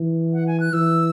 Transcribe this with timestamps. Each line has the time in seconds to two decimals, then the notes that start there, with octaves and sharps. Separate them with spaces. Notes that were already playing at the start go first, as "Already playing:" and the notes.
Already playing: E3
0.34 F#5
0.47 G#5
0.60 F#6
0.73 E3 E6